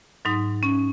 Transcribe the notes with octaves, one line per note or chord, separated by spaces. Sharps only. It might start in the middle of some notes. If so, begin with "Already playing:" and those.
G#2 F#3 D#4
C#4